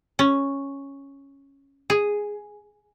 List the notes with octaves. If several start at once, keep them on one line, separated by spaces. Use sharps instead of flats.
C#4
G#4